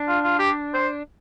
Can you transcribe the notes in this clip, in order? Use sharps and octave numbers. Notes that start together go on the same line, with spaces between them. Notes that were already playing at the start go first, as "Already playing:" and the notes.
Already playing: D4
F4
F4
G4
C5